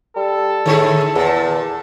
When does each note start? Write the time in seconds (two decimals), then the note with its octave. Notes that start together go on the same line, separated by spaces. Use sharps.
0.16 G3 A4
0.66 A2 D3 E4 G#4
1.15 E2 A#2